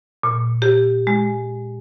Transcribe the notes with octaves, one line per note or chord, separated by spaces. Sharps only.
A#2
G4
G#3